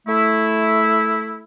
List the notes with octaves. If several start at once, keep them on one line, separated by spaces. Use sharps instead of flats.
A3 E4